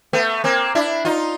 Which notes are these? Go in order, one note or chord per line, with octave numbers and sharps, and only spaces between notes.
A3 B3
A#3 C4
D4 E4
D#4 F4